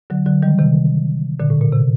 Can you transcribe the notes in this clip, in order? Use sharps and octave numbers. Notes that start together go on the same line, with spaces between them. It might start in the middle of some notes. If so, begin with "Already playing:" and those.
D3 F#3
D3 F#3
D#3 G3
C3 D#3
A#2 D3
A2
A#2
C3